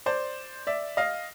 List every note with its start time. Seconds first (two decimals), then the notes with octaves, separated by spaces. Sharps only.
0.06 C5 D5
0.67 D5 E5
0.97 D#5 F5